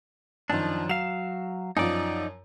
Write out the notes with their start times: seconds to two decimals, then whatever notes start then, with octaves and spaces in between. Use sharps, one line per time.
0.50 F#2 D#3 F3 D4
0.89 F#3 F5 E7
1.77 F#2 F3 D#4 D5